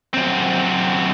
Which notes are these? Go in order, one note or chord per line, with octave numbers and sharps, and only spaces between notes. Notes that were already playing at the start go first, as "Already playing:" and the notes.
F#2 C4